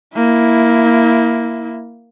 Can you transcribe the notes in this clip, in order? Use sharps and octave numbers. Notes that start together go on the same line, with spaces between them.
A#3 E4